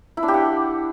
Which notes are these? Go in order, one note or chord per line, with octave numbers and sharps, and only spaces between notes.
E4
D4
G4
F#5